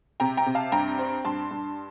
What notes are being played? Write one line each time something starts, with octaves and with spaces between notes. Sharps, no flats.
C3 G5 A#5
G5 A#5
C3
F5 A5
G2 G5 A#5
C4
G2 A5 C6
G2